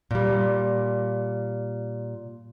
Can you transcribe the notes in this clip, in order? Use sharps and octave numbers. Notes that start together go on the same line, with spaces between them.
A#2 G3